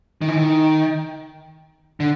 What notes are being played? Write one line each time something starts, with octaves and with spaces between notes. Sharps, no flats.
D#3
E3
D#3
D3